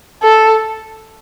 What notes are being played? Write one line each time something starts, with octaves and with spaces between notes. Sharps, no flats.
A4